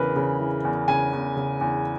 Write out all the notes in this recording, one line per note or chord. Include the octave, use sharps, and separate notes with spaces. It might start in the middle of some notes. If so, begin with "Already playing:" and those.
Already playing: E2 C#3 E3 A#4 B4
C#3
E3
E2
C#3 G#5
E2
C#3
E2